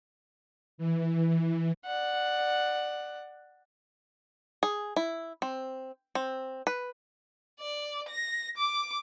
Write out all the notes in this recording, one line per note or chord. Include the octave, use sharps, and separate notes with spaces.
E3
D5 F#5
G#4
E4
C4
C4
B4
D5
A#6
D6